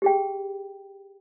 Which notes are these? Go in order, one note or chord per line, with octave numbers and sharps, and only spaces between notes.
G4 G#4 G5